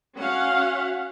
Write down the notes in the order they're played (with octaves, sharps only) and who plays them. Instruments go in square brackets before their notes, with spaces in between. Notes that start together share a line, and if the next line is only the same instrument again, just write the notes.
[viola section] C#4 F#4 F5 F#5